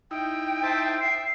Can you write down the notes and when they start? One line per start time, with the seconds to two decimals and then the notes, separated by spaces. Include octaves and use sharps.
0.11 D#4 E4 G5
0.63 C5 E5 A5
1.01 E5 C7